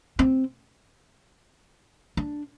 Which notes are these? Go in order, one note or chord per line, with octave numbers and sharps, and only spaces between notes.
C4
D4